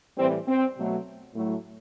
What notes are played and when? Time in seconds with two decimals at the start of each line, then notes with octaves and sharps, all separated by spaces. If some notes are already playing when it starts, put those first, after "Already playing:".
0.17 A2 E3 G3 C4
0.47 C4
0.77 B2 F#3 A3
1.35 A2 F#3 A3